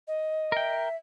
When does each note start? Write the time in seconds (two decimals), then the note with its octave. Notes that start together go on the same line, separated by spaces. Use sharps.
0.07 D#5
0.52 A#4 E5 G5